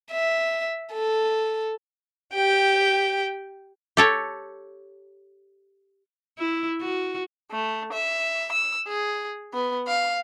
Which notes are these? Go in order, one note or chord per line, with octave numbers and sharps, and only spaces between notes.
E5
A4
G4 G5
G4 A4 C#5
E4
F#4
A3
E5
E6
G#4
B3
F5